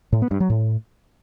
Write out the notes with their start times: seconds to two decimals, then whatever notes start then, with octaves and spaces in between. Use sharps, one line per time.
0.12 A2
0.22 B3
0.31 G2
0.40 F#3
0.50 A2